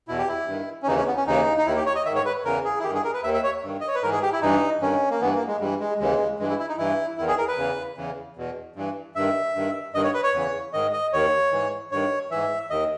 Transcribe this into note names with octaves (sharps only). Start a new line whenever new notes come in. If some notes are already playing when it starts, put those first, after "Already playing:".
E2 B2 E4
G4
E4
G2 D#3
C#4
D#2 C#3 E3 D#4
C#4
B3
C#4
D#2 C#3 E3 D#4
D#4
D#2 D#3 E4
G4
C#5
D#5
G#2 D#3 E5
C#5
B4
E2 C#3 E3 A#4
G#4
E4
G2 D#3 G4
G#4
A#4
B4
D#2 D#3 E5
E5
C#5
G2 D#3
D#5
C#5
B4
G#2 E3 A#4
G#4
G4
E4
G2 E3 D#4
G2 D#3 C#4
A#3
G2 E3 B3
A#3
G#3
G2 E3 G3
G#3
D#2 C#3 E3 G#3
G2 E3 G#3
E4
E4
D#4
G2 E3 E4
E2 D#3 E4
G#4
A#4
B4
E2 C#3 E3
E2 C#3 E3
E2 B2
G2 E3
G2 D#3 E5
G2 D#3
G2 D#3 D#5
C#5
B4
C#5
E2 C#3 E3
G#2 D#3 D#5
D#5
D#2 D#3 C#5
G#2 E3
G2 D#3 C#5
G#2 E3 E5
D#2 D#3 D#5